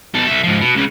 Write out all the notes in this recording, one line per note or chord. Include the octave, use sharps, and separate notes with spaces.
B2 A4
C2 E5
G#2 F3
B2
C#2 C#3